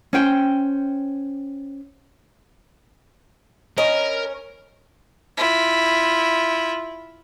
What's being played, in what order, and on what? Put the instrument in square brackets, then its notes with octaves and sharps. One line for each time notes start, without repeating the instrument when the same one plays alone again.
[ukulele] C#4 C5 G5
[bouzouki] C#4 [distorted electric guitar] A#4 [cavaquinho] D#5 B5 D#6
[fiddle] E4 F4